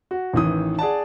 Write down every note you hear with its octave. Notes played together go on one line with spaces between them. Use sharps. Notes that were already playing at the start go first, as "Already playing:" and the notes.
F#4
A1 D#3 E3 D#6
G#4 D5 F#5 A5